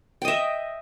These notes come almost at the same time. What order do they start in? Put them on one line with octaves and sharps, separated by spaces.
G5 D#5 E5